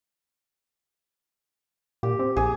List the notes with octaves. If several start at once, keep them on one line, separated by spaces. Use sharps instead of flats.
A#2 G4
C4
A#1 G#4